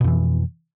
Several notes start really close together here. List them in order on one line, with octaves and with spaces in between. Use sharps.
B2 F2 E3